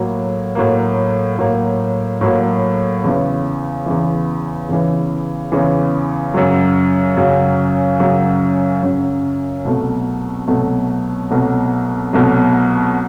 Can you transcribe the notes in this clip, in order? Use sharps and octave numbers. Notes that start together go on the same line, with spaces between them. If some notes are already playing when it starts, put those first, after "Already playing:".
Already playing: A2 F#3 A#3
A2 F#3 A#3
A2 F#3 A#3
A2 F#3 A#3
E2 C#3 E3
E2 C#3 E3
E2 C#3 E3
E2 C#3 E3
F#2 C#3 F#3
F#2 C#3 F#3
F#2 C#3 F#3
F#2 C#3 F#3
C2 B2 F#3 A3
C2 B2 F#3 A3
C2 B2 F#3 A3
C2 B2 F#3 A3